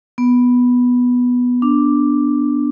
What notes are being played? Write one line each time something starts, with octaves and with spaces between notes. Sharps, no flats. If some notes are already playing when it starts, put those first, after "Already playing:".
B3
D4